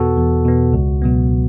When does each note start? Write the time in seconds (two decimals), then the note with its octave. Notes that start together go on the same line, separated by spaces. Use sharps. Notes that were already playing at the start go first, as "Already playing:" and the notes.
Already playing: E2 B2 B3 F#4 A4
0.18 E2
0.45 B2 B3
0.73 C#2
1.02 B2 F#3 B3